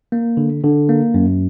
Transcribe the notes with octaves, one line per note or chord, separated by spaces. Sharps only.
A#3
D3
D3
A#3
F#2